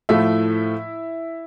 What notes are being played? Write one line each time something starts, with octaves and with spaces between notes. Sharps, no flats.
A2 F3 A3 E4 E5